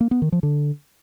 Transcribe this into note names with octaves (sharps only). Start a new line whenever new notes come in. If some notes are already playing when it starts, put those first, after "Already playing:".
A#3
B3
D#3
F3
D3